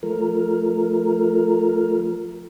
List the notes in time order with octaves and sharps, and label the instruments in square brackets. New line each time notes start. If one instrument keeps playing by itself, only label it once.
[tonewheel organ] F3 A3 A#4